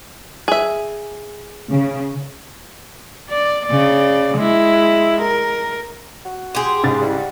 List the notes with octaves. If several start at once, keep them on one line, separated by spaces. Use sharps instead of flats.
G#4 E5
C#3
D5
C#3 D5
G#3 E4
A#4
F#4
G4 G#4 C6
G#2 C#3 A6
G3 E4
F#5